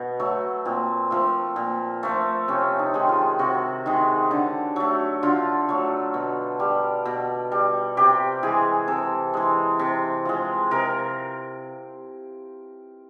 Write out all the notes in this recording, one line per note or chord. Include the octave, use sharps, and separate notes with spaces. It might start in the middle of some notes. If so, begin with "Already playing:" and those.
Already playing: B2 B3
F#3 A3
A#2 C4
F3 A3
A#2
F3 A3
C3 C#4
D#4
D#3 G#3
F4
C3 F#4
D#3 G#3
D3
F#3 A3
D3 F4
F#3 A3
B2
G3
B2
G3
C3 G4
E3 G#3 G#4
C3 A4
E3 G#3
C3
F3 G#3
C3 A#4